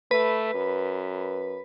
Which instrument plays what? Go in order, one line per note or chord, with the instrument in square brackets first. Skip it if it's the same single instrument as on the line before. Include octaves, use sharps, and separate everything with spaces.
[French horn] A3 [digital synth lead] B4
[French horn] F#2